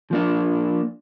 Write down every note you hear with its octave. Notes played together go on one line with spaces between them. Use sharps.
F3 A#3 D4